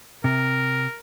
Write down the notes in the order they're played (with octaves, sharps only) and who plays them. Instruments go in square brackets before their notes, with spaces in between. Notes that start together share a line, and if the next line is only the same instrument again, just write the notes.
[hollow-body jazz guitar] C3 [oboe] A#4